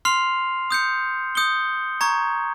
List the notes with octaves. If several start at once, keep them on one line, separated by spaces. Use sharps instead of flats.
C6 F6 C7 F7
D#6 G6 C#7
D#6 G6 C#7 G7
A#5 C#6 G#6